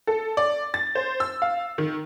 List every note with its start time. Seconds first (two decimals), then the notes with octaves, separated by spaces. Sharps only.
0.07 A4
0.37 D5
0.74 A6
0.95 C5
1.20 E6
1.42 F5
1.78 D#3